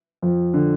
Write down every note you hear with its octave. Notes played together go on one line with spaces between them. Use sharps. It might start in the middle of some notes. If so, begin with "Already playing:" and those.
F2 F3
D3